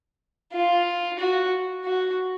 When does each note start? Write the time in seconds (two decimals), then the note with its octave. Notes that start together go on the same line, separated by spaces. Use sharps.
0.52 F4
1.19 F#4
1.84 F#4